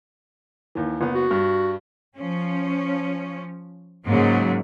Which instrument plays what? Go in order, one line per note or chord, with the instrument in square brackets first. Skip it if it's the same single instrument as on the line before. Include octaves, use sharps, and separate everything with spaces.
[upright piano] D#2 E3
F#1 B3
[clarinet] F#4
[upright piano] G2
[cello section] F3 C#4
G#2 C#3 F#3 G#3 A#3